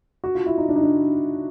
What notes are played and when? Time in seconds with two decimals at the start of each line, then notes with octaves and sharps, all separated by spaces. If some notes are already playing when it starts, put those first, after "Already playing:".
0.24 F#4
0.35 F4
0.46 E4
0.58 D#4
0.69 D4
0.76 D#4
0.83 D4